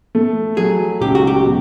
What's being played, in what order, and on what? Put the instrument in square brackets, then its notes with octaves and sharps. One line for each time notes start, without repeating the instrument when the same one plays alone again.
[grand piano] A3
[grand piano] F#3 [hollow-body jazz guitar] G#4
[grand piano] C#2 [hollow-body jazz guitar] G4
[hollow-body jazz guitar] F#4
G4
[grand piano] B2